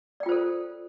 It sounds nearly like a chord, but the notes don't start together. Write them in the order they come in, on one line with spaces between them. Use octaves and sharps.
D5 G5 F4 C5 A4